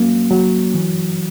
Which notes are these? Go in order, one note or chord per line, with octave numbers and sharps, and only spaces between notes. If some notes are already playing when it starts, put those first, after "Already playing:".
Already playing: F#3 A#3 C#4
F#3
E3